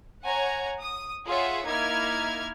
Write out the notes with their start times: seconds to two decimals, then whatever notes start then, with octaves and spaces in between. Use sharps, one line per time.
0.24 C#5 F#5 G#5 A#5
0.81 D#6
1.26 F4 G#4 C#5 E5 F#5
1.66 A#3 D#4 E4 F6 G#6